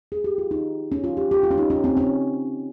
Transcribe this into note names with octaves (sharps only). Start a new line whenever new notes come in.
G#4
G4
F4
D#4
C#4
F4
G4
G4
F4
C#4
D#4
C#4
C4
C#4